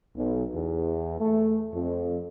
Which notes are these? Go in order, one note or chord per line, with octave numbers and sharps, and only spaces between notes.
B1
E2
A3
F2